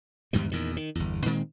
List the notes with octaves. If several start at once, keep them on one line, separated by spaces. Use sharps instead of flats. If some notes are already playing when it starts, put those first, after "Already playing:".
E2 G#2 D#3 G3
E2 A#2 D#3
D#3
G1 E2
A#2 D#3 G#3 C4